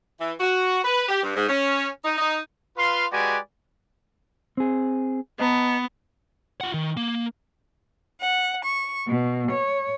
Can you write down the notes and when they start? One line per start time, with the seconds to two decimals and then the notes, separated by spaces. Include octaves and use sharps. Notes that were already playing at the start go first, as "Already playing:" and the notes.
0.20 E3
0.40 F#4
0.84 B4
1.09 G4
1.23 G2
1.36 G#2
1.49 C#4
2.05 D#4
2.18 D#4
2.78 F4 B4 F5 C6
3.12 G#3 F#4 G4 B4 D5 G#5
4.57 C4 G#4
5.40 B3 D#5 A5 A#5
6.61 F4 F#5
6.74 D#3
6.97 A#3
8.21 F#5
8.65 C#6
9.06 B2
9.52 C#5